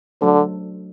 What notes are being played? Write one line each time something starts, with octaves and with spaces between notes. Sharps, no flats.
D3 F#3 A3 D4 A4 C5